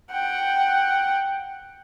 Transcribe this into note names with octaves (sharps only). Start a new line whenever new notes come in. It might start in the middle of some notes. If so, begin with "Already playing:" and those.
F#5 G5